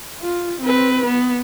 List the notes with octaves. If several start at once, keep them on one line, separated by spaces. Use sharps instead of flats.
F4
C4 B4
B3